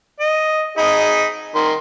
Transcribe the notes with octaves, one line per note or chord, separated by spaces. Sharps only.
D#5
D#4 G#4 B5
D#3 A#5 C6